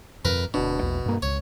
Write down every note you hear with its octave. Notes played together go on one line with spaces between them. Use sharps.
F2 A#4 B4
D1 B2 D4
A#1 E2
G2 A#3
C#2 C#5